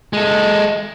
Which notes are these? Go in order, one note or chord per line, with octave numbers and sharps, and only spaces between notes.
G#3 A4